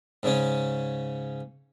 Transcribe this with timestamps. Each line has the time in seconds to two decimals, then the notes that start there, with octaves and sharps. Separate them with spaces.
0.23 G#2 C#3 C#4